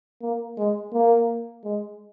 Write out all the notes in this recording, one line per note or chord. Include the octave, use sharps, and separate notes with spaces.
A#3
G#3
A#3
G#3